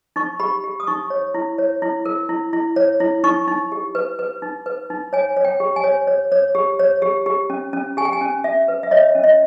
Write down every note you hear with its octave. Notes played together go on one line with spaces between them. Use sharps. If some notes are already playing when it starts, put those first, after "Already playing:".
D#4 C#6
G4 B5
G4
D#6
D#4 C#6
C#5
E4
C#5
E4
A#4
E4
E4
C#5
E4
D#4 C#6
D#4
G4
B4
B4
D#4
B4
D#4
C#5 G#5
C#5
G5
G4
G#5
C#5
C#5
C#5
G4
C#5
G4
G4
C#4
C#4
G4 G#5
G5
G#5
C#4
C#4 E5
B4
E5
C#5 D#5
C#4
D#5